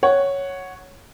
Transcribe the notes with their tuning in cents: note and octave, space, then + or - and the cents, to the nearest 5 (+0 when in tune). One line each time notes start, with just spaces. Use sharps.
C#5 +0 F#5 +0